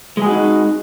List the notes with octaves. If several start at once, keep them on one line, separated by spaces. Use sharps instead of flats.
G#3 D#4 F#4 G#4